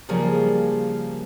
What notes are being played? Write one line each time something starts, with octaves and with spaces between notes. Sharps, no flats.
C#3 F3 G3 A#3 G#4